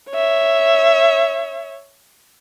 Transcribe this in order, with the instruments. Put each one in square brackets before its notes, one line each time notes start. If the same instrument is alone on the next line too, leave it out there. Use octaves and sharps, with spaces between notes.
[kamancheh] C#5 E5